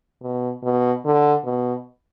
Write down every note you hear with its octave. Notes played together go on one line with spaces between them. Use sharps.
B2
B2
D3
B2